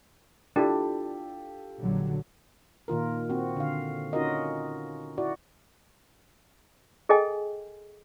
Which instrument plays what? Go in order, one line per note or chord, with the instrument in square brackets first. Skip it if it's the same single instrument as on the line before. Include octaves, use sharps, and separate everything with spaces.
[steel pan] D4 E4 [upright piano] F4 G4 A4
[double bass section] A#1 D3 F#3
[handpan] A#2 D#3 F4 A#4
C4 F#4
D3 F5
C#4 D#4 F4 F#4 A#4 D#5
E4 F#4 D5
[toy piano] G#4 A4 D#5 G5 G#5